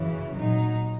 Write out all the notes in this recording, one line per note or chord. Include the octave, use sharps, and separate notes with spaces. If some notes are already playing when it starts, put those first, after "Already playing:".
Already playing: F#2 C#3 E3
A#2 F#3 D#4